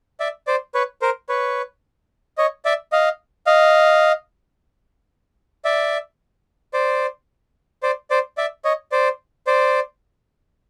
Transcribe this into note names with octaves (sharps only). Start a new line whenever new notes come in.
D5 E5
C5 D5
B4 C#5
A#4 C5
B4 C#5
C#5 D#5
D5 E5
D#5 F5
D#5 F5
D5 E5
C5 D5
C5 D5
C5 D5
D5 E5
C#5 D#5
C5 D5
C5 D5